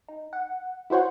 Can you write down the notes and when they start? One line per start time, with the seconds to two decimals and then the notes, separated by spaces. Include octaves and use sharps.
0.08 D#4
0.33 F#5
0.90 E4 F#4 C5 C#5 F#5